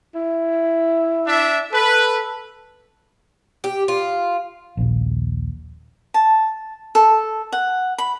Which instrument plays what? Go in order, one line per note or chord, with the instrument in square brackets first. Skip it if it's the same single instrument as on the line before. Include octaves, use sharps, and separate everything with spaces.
[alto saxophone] E4
[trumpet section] D4 E5
[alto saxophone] A4 [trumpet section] B4
[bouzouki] G4
F4
[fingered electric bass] D#1 A#1
[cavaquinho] A5
A4
F#5
B5